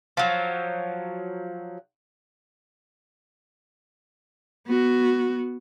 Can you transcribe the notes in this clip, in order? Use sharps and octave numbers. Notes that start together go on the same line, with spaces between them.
F3 F#3
B3 F#4